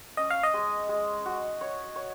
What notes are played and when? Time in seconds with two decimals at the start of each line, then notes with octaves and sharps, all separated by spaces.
0.17 C#4 D#5
0.30 F5
0.43 D#5
0.54 G#3
0.89 G#3
1.26 F#4
1.61 C#5
1.96 C#5